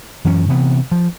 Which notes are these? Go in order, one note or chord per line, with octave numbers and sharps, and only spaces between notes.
F#2 E3 F#3 C#4
C3 E3 B3
F3